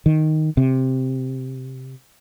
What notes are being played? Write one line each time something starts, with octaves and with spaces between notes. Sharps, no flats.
D#3
C3